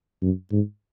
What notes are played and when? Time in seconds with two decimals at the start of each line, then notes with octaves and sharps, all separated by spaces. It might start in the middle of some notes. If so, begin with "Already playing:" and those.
0.22 F#2
0.52 G#2